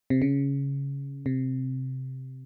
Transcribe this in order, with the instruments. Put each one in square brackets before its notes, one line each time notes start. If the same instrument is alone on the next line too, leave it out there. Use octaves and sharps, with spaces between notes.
[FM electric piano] C3
C#3
C3